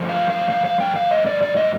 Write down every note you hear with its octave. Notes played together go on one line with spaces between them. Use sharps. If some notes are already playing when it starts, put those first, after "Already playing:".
Already playing: G2 F3 A3
F5
F5
F5
F5
G5
F5
D#5
D5
D5
D#5